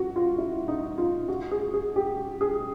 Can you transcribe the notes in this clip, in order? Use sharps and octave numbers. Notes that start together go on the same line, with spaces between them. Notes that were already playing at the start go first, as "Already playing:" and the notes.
Already playing: F#4
F4
E4
D#4
F4
F#4
G#4
G#4
G4
G#4